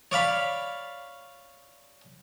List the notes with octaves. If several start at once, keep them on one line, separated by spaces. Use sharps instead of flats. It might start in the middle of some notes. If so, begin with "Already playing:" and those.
C#5 D5 F5 B5